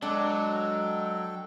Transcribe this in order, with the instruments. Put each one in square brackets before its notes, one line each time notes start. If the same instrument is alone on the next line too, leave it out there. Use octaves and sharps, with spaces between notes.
[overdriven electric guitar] F#3 [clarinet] G#3 [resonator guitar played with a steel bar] D4 [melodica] A4 G5